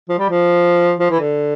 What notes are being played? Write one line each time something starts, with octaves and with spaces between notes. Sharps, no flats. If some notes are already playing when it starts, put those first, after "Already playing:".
F3
G3
F3
F3
E3
D3